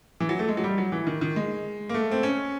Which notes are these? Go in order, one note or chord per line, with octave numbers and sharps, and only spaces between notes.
E3
F#3
A3
G#3
F#3
G3
F#3
E3
D#3
D#3
G#3
A#3
A3
C4
C#4